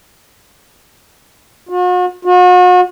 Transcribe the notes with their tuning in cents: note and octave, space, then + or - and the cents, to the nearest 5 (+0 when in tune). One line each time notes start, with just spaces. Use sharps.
F#4 -45
F#4 -40